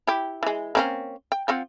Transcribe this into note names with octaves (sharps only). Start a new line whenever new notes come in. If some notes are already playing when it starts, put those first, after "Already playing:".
E4 G4
E3 G#3
A#3 C4 C#4
G5
F3 C4 F#5